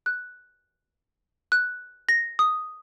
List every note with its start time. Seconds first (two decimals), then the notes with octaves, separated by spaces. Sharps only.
0.06 F#6
1.52 F#6
2.09 A#6
2.39 D#6